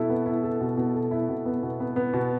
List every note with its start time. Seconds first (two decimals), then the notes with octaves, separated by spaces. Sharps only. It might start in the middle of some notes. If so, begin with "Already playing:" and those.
Already playing: B2 E4 A4
0.10 B3
0.26 E4
0.44 A4
0.61 B2
0.77 B2
0.94 A4
1.11 E4
1.29 B2
1.45 B3
1.63 B2
1.80 B3
1.96 B3
2.14 B2